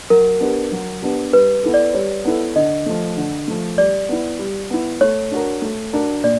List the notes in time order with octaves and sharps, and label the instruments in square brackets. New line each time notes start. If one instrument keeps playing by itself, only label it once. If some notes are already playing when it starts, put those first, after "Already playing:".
[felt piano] F#3 [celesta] A#4
[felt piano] B3 D4 G4
F#3
B3 D4 G4
[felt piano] G3 [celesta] B4
[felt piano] B3 E4 A4
[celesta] D5
[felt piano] G3 [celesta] C#5
[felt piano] B3 E4 A4
[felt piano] D3 [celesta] D#5
[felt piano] F3 A3
D3
F3 A3
[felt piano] G3 [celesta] D5
[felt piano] B3 E4
G3
B3 E4
[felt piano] A3 [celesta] C#5
[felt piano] D4 F#4 A#4
A3
D4 F#4 A#4
[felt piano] A#2 [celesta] D5